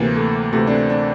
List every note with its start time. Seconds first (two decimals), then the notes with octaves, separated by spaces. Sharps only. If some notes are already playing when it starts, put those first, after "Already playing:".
Already playing: D2 C3 E3 A#3
0.16 A3
0.52 D2 C3 E3 A3
0.67 D4
0.71 C4
0.90 D4